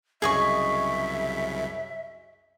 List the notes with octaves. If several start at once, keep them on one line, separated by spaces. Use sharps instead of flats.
C2 F#2 C#3 G#4 D#5 E5 C#6